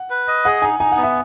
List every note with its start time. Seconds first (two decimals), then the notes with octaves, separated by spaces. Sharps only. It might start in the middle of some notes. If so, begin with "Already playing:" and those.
Already playing: F#5
0.10 B4
0.28 D#5
0.45 G#4 F#5
0.62 D#4 G#5
0.80 D#4 G#5
0.92 F#5
0.97 B3
1.03 E5